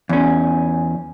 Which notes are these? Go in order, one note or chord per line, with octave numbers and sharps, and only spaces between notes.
E2 C#4